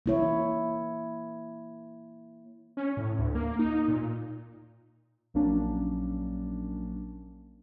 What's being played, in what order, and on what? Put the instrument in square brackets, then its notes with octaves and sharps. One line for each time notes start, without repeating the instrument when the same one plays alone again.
[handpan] A#3 E4 C#5
[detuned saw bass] C#4
A2
D2
A#3
D#4
A#2
[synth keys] A#1 F#3 A#3 C#4 D4